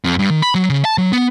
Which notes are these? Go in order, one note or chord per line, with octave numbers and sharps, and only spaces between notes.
F2
G2
D#3
B5
F#3
C#3
A5
F#3
B3